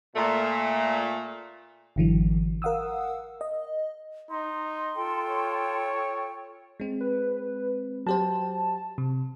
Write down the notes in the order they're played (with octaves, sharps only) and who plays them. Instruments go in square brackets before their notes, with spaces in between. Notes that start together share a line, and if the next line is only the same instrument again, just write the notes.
[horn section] A#2 A3
[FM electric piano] G#1 D3 E3 F#3
A#4 F5 F#5 D#6 E6
D#5
[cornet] D#4 [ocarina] C6
[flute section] F4 A4 G5
[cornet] C#5
[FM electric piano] G#3 C4
[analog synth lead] B4
[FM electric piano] F#3 G4 C5 [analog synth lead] A5
[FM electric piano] C3